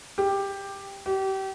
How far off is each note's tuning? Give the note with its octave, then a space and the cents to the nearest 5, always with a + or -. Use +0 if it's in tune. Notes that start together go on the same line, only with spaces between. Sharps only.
G4 +10
G4 -30